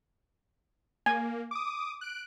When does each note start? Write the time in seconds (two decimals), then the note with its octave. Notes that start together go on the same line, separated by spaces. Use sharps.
1.06 A#3 G#5
1.51 D6 D#6
2.01 F#6 D7